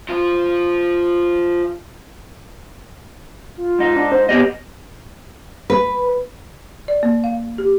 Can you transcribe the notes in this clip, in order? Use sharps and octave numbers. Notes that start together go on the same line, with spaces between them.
F3 F4
F4
G#2 D#4
D4
C5
F#3 B3 G4 D#5
B4
D5
A#3
F5
G4